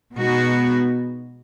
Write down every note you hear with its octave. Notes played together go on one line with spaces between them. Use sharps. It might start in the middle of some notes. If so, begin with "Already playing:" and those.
B2 G#3 B3 D#4 F#4